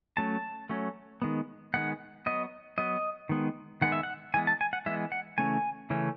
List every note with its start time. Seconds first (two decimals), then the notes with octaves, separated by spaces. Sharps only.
0.17 F#3 A3 C#4 A5
0.69 F#3 A3 C#4
1.22 D#3 G#3 B3
1.74 D#3 G#3 B3 F#5
2.26 F#3 B3 D#5
2.78 F#3 B3 D#5
3.29 D#3 G#3 B3
3.81 D#3 G#3 B3 F#5
3.92 E5
4.03 F#5
4.34 E3 G#3 B3 G#5
4.47 A5
4.61 G#5
4.73 F#5
4.86 E3 G#3 B3 E5
5.12 F#5
5.38 C#3 E3 A3 C#4 G#5
5.90 C#3 E3 A3 C#4